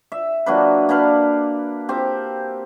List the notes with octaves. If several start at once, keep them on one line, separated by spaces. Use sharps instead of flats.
E5
F#3 A#3 D4 B4
A#3 D4 B4 F5
C4 G4